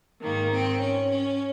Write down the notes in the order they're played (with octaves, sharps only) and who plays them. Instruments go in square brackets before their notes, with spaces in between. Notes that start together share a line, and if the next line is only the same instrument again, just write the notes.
[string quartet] G#2 D#3 A#3
C4
C#4
C#4